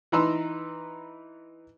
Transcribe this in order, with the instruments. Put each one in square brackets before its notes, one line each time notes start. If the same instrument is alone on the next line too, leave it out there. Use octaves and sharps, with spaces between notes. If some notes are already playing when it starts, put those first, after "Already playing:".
[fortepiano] E3 D#4 B4 A#5 C6 E6